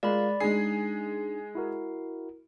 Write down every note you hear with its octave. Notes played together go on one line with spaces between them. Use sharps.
G#3 F4 A#4 D5 F5 B5
G#3 D4 D#4 G#4 C7
E4 F#4 A#4